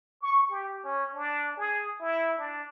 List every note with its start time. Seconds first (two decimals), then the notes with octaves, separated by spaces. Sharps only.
0.22 C#6
0.50 G4
0.85 C#4
1.15 D4
1.57 G#4
2.00 E4
2.38 D4